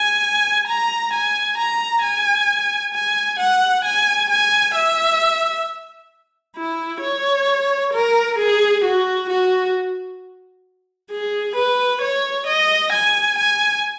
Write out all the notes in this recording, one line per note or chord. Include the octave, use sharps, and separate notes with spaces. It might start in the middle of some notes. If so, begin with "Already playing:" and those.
Already playing: G#5
A#5
G#5
A#5
G#5
G#5
F#5
G#5
G#5
E5
E4
C#5
A#4
G#4
F#4
F#4
G#4
B4
C#5
D#5
G#5
G#5